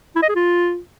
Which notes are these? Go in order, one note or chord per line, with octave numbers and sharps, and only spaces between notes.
E4
D#5
G#4
F4